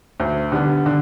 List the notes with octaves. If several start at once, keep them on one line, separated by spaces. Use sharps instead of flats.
D2
D3 G3 B3
D3